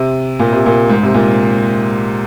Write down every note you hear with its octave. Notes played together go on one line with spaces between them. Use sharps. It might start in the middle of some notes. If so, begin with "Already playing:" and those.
Already playing: C3
A#2
C3
A#2
G#2
C3
A#2